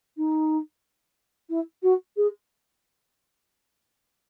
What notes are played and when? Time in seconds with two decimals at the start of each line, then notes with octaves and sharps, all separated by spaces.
0.17 D#4
1.50 E4
1.83 F#4
2.17 G#4